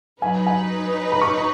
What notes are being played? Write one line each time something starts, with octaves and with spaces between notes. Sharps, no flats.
F#3 D#4 B4 G#5
G#5
B5
C#6
B5